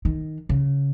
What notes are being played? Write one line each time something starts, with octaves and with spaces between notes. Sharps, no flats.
D#3
C#3